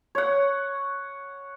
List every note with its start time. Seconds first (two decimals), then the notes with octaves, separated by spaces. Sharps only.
0.15 C#5 F#5